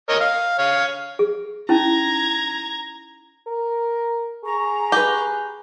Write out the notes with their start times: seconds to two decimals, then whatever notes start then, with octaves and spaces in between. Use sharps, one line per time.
0.09 A#4 C#5 D#5
0.20 F5
0.58 C#5 F5
1.19 G#4
1.69 C#4 D#4 E4 A#5 G#6
3.47 A#4
4.44 G#4 A#5 C#6
4.92 G4 B4